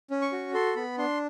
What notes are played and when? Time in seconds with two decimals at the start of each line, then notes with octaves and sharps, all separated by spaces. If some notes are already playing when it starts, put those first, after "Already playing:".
0.11 C#4
0.22 C#6
0.32 F#4
0.54 A4 C6
0.76 B3 B5
0.98 D4 C6